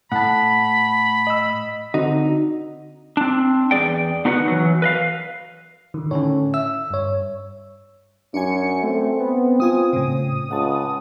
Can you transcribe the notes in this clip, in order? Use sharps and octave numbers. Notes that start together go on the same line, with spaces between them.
A2 F#5 A5 B5
D#5 E6
D3 C4 D#4 F#4
C4 D4
E2 A#3 G#4 D5 G5
B3 D#4 F#4 B4 F5 F#5
E3 F#3
B4 D#5 F5
D3 D#3
A2 D3 C#4 C#5
E5 E6
G2 C#5
F#2 D4 G#5 C#7
A3 C4
B3
B3 F4 G#5 D#6
A2 C#3
C#2 F#5 A5